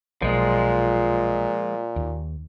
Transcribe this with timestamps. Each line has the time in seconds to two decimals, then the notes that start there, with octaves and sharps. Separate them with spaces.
0.22 B1 A#2 F3 G#3
1.96 D#2